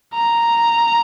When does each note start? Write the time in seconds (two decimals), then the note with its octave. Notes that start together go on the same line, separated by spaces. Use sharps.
0.14 A#5